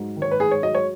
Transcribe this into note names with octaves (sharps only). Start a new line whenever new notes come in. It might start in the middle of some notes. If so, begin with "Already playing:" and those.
Already playing: G#2 F#3
D#3
C#5
B4
G#2 G#4
C#5
F#3 D#5
C#5